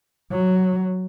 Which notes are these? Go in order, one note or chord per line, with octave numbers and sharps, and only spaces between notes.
F#3